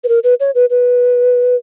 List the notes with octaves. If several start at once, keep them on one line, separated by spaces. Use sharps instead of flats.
B4
A#4
B4
C#5
B4
B4